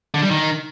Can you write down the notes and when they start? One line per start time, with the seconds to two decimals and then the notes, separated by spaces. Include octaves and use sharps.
0.14 D3
0.22 G3
0.30 D#3